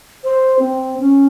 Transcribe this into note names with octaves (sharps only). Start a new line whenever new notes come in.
C5
C4
C#4